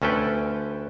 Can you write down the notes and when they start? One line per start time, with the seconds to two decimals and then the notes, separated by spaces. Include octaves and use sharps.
0.02 D2 C#4 A4 B4 G5